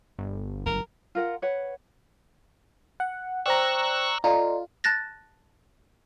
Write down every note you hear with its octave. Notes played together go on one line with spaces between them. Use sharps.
G1
F#3 A#4
F4 A#4 F#5
B4 C#5 F#5
F#5
C5 D5 G5 A#5 C#6 E6 F#6
F4 A4 D5 D#5 A#5
A5 F#6 A6 A#6